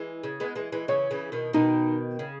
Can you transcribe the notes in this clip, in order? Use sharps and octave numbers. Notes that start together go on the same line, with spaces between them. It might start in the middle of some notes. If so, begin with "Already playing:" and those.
Already playing: E3 G#3
C#3
G#3 B3
E3 G#3
E3 G#3
C#3 E3 C#5
C#3 E3
B2 D#3
B2 D#3 D#4
C#3